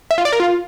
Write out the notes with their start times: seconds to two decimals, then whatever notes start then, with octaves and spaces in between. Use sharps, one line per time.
0.11 E5
0.18 F4
0.25 D5
0.32 A#4
0.40 F4